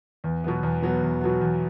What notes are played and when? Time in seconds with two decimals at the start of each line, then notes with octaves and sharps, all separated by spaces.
0.24 E2
0.44 B2 F#3 B3
0.63 E2
0.82 B2 F#3 B3
1.03 E2
1.21 B2 F#3 B3
1.41 E2